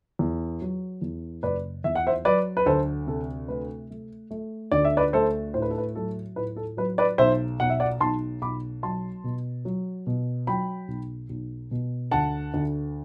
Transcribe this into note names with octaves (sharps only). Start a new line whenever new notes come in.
E2
F#3
E2
F#1 B4 D5
E2 E5
F#5
C5 E5
F#3 B4 D5
B4
D2 A4 C5
C3 A4
A3 B4
A3
A3
D2 D5
E5
B4 D5
A3 A4 C5
A2 C5
B4
A4
B4
F#3 A4
A2 B4
A4
F#3 B4
B4 D5
B1 C5 E5
B1 F#5
E5
D5 F#5
B1 A5 C6
B1 B5 D6
F#3 A5 C6
B2
F#3
B2
F#3 G5 B5
B1
B1
B2
D2 F#5 A5
D2